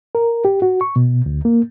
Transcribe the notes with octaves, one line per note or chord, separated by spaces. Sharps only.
A#4
G4
F#4
C#6
B2
D2
A#3